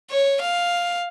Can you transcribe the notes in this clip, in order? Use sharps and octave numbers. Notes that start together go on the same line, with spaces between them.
C#5
F5